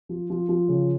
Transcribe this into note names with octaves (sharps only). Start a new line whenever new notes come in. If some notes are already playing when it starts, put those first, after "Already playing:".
F3
F3
F3
C#3